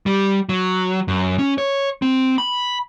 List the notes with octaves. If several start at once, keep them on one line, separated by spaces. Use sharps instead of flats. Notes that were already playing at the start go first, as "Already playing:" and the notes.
G3
F#3
F#2
C#4
C#5
C4
B5